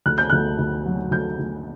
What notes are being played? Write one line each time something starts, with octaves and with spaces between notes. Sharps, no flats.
D2 F#6
G6
D2 F#6
D2
F#3
D2 G6
D2